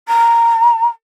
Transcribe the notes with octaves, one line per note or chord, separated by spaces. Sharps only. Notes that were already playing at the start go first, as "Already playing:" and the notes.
A#5